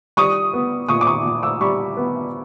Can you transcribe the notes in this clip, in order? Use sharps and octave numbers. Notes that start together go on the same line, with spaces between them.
G3 C#6 D#6
B3
A#2 C#6 D#6
D6
C#6 D#6
A#2
D6 E6
G3 B5 C#6
B3